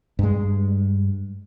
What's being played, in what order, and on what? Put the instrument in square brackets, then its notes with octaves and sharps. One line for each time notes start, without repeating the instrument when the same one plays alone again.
[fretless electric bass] G2 G#3